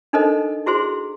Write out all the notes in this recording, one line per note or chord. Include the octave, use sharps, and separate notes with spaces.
D4 D#4 A4 A#4 C5 D#5
E4 F#4 G#4 C5 C6